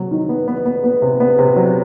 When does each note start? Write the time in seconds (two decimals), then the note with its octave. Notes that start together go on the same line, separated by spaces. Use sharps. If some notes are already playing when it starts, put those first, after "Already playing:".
Already playing: C3 F#3
0.11 D#3
0.29 B3
0.48 B3
0.66 B3
0.84 B3
1.02 C3
1.20 B3
1.39 C3
1.56 F#3